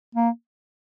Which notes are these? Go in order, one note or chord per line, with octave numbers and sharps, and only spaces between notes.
A#3